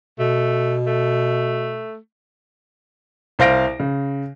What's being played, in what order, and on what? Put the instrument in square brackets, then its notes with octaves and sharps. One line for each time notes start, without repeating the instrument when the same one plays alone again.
[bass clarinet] B2 [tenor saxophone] A3
[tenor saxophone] A3
[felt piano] C2 C5 F5 A#6 D7
C#3